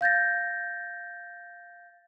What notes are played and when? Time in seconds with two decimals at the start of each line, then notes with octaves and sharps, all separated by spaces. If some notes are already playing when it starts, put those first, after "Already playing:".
0.01 F5 G6 A6 A#6